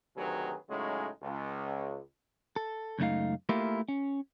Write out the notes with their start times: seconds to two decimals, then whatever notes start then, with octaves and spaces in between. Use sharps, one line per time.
0.16 D2 C3 D#3 F#3 G#4 B4
0.69 A2 C#3 F#3 G#3 C#4 D#4
1.23 C#2
2.56 A4
2.99 C#2 F#2 A3 D#4 F5
3.49 A3 A#3 E4 F4 G4 A#4
3.88 C#4